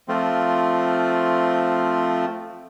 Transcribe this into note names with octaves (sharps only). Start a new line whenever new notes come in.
F3 A3 C4 F4